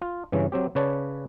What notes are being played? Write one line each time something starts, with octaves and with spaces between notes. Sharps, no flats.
F4
G2 C#3 E3 C#4
F#3 C4 G4
C#3 B4 C#5 D5 A5